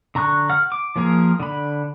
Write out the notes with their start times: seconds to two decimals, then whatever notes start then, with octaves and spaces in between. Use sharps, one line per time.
0.15 D3 A#5 C#6 F#6
0.50 F#5 F6
0.72 D6
0.96 F3 A#3 G#4 A#4
1.40 D3 B5